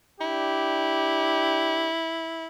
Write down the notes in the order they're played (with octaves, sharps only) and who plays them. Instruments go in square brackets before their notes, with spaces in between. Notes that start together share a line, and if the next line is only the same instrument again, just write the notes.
[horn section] D4 G4 [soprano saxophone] E4